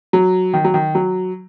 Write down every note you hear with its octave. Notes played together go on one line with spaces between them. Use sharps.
F#3
D#3
F#3
D#3
F#3